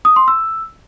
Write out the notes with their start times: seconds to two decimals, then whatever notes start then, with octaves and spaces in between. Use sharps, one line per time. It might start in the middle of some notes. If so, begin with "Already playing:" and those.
0.05 D#6
0.16 C6
0.28 E6